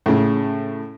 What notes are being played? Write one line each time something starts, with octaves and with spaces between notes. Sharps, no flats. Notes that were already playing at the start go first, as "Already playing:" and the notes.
A2 C#3